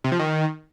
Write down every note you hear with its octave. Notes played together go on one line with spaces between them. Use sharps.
C3
F3
D#3